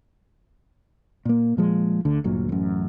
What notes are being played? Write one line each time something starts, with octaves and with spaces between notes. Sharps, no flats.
A#2 A#3
A#2 F3 G#3
D2 D3
G1 D2 A#2 F#3
A1 F#2